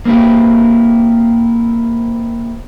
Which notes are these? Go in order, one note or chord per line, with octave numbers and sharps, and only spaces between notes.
A#3 C4 E4 G4